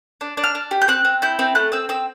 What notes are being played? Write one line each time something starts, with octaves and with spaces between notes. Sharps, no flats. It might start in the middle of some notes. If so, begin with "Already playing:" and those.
D4
D4
F6
D4
G4
G6
C4 F#6
C4
E4 G6
C4
A3 F#6
C4 E6
C4 E6